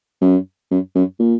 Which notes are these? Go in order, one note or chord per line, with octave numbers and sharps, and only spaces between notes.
F#2
F#2
F#2
A#2